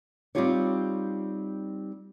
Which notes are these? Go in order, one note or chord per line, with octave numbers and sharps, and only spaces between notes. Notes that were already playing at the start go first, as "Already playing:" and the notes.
G3 C4 D#4 F4 G4 C#5